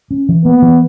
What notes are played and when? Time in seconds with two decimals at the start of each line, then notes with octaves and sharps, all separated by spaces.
0.11 C#4
0.29 E3
0.45 A#3 B3
0.62 E3